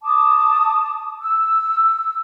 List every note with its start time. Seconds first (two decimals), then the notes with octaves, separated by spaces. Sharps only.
0.04 A5 D6 D#6
1.21 E6